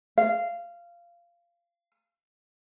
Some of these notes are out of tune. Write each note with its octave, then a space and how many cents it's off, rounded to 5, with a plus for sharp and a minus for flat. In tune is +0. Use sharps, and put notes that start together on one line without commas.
F5 -15